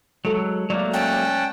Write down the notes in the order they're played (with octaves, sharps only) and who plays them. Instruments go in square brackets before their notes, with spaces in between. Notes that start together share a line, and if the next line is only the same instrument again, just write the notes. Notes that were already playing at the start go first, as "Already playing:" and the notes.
[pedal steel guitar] F#3 [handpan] G#3 A4
[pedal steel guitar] F#3 A3 A#3 [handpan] D5
[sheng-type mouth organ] C#4 F#5 A5 [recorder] G5